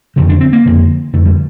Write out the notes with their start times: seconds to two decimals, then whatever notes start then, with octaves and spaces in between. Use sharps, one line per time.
0.16 F2 D3 D#3
0.29 D4
0.41 C4
0.53 A#3
0.65 F2 D3
1.13 F2 D3 A3
1.26 G3